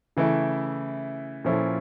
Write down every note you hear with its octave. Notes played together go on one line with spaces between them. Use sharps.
C#3 E3 A3 E4
A#2 F3 C#4 E4 A4